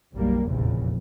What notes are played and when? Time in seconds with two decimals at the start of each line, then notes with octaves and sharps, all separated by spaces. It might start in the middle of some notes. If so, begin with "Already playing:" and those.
0.13 F#1 B1 G3 A#3
0.46 F1 A#1 E2 C#3